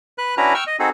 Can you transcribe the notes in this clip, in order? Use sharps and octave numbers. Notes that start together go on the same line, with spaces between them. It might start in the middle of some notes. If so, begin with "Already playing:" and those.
B4 F#6
C#4 D4 E4 F#4 B4 A#5
G5 C#6 E6 F6
D#5
C4 D#4 F#4 G#4 A4